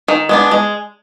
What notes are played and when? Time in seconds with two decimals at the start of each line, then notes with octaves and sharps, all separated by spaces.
0.08 D#3
0.29 G#3 B3 D4
0.51 G#3